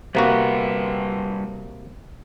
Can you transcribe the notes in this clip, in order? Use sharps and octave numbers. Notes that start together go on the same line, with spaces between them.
C3 G3 A#3 F#4 B4 F#5